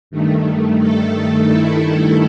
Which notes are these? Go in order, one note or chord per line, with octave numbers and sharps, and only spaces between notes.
G2 D#3 A3
A4
E4